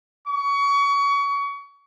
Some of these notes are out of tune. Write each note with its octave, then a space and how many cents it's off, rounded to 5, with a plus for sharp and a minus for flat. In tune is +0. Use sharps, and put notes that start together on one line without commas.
C#6 +30